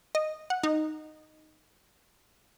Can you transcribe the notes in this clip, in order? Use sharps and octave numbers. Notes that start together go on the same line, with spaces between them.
D#5
F#5
D#4